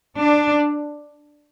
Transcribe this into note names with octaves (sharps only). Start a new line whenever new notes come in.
D4